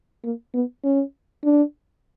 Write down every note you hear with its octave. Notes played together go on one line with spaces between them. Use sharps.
A#3
B3
C#4
D4